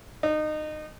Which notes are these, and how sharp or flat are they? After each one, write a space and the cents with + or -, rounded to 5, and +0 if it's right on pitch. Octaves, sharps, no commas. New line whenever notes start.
D#4 -25